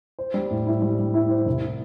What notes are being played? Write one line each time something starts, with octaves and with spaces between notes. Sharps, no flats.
C5
G3
A2
E4
G3
G3
E4
C5
C2